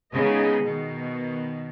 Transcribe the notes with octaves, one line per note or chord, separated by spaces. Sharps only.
C#3 G#3 B3 D#4 G#4 D#5
B2 D#3